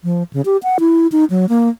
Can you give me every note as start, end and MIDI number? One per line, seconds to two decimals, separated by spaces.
0.04 0.23 53
0.33 0.42 49
0.45 0.57 67
0.63 0.78 78
0.80 1.07 64
1.12 1.25 63
1.30 1.46 54
1.49 1.69 58